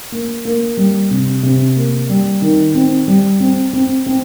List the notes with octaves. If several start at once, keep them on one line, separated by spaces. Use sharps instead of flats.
A#3
A#3
G3
C3
C3
A#3
G3
D#3
C4
G3
C4
C4
C4